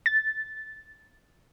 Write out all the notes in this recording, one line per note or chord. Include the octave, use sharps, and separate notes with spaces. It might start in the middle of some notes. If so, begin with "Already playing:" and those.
A6